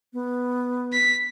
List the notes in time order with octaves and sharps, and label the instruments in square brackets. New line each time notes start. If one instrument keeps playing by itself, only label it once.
[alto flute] B3
[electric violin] B6